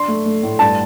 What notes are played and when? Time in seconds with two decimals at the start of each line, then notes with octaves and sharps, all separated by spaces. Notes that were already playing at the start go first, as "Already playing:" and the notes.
Already playing: D4 C6
0.08 A3
0.26 A3
0.43 A2
0.59 G2 A5